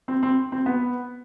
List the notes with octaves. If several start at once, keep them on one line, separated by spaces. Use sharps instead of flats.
C4
C4
C4
B3